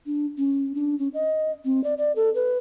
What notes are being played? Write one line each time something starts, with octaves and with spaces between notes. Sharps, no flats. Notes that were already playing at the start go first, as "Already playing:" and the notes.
D4
C#4
D4
C#4
D#5
C4
D5
D5
A4
B4